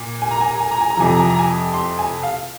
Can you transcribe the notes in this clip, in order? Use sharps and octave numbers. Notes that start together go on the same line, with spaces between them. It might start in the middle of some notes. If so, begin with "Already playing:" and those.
Already playing: A#2
G#5
A#5
G#5
A#5
G#5
A#5
G#5
A#5
F2 C3 F3 G#5
A#5
G#5
A#5
G#5
C6
G#5
F5